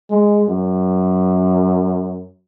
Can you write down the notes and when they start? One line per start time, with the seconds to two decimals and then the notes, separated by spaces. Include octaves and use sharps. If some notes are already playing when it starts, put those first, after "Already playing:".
0.11 G#3
0.49 F#2